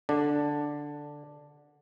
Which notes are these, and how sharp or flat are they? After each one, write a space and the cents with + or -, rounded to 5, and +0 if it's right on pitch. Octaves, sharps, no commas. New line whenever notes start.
D3 +0 D4 +0